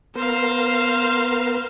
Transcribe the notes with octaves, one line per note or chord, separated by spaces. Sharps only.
B3 A#4 C5 F5